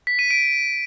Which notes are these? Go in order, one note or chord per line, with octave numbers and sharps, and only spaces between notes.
B6
D#7
D7